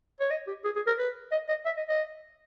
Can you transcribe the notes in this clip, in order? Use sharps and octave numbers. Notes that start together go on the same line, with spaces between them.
C#5
D#5
G4
G#4
G#4
A#4
B4
D#5
D#5
E5
D#5
D#5